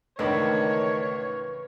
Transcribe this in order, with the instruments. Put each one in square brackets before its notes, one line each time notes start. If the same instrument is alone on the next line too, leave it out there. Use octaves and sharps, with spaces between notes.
[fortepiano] C#2 A2 D4 [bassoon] D#3 [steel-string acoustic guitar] E3 [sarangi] C#5